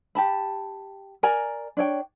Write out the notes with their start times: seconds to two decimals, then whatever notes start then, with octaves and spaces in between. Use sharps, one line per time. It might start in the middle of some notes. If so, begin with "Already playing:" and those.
0.15 G4 A5 B5
1.23 A#4 D5 G#5 A#5
1.77 D4 C#5 G5